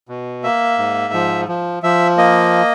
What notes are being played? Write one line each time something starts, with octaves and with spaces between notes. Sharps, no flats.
B2
A#3 E5
G#2
F3
F3
F3 E5
A#3 D#5